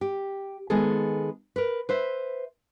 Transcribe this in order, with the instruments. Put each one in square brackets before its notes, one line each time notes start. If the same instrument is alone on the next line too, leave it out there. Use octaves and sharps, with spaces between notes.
[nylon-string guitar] G4
D#3 G#3 B3 G#4 A4
A#4 B4
B4 C5 E5